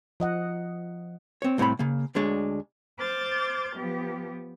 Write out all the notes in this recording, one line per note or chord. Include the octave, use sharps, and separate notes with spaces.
F3 D#5 F#5
C4 C#5
C2 A2 C4 C#5 B5
C#3 A#3
D2 D3 G#3 D4 C#5
C5 D6 F6 G6 A6
F3 B3 G4